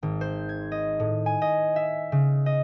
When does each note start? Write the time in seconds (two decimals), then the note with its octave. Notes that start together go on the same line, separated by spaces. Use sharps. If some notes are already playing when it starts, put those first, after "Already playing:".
0.03 G#1
0.21 C5
0.49 G#6
0.72 D#5
1.00 A2
1.26 G#5
1.42 D#5
1.76 E5
2.12 C#3
2.46 D#5